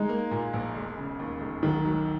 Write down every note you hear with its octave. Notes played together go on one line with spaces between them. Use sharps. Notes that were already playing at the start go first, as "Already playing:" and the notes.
Already playing: G#3 D#4
A#3
A#2
A#1
E1
C#3
D#2
E1
B1 D#3
F#3